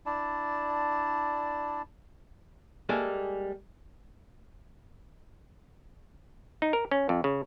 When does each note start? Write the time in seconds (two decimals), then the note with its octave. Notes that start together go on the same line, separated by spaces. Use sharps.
0.06 D4 E4 D5 A5
2.89 G3 G#3 A#3 G#4 A4 E5
6.62 D#4
6.73 A#4
6.91 C#4
7.09 F2
7.24 C#3